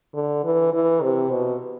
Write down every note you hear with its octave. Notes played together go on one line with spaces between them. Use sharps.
D3
E3
E3
C3
B2